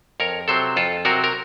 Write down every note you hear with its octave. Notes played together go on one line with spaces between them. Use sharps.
F2 A#4 C#5
C3 F#3 C4 A4 C5
F2 F4 A4
C3 F#3 C4 F#4 A#4
A#4